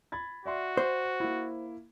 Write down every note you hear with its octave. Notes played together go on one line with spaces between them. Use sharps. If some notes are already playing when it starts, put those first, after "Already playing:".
B5 G#6 A6
F#4 D5 E5 C6
C5
A#3 E4